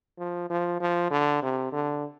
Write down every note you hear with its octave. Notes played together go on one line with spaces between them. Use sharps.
F3
F3
F3
D3
C3
D3